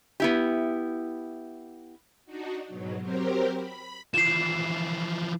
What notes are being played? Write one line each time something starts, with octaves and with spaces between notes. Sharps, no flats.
B3 E4 G4
D4 D#4 F#4
G#2 B2 F#3
F#3 C4 G4 A#4 C5
B5
E3 F3 C7 E7